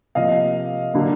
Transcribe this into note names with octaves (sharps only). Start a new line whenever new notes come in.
C3 F3 A#3 D#5 F5
D3 F#3 A#3